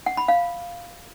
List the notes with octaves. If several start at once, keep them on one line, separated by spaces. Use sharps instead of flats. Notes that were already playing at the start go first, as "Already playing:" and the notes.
F#5
B5
F5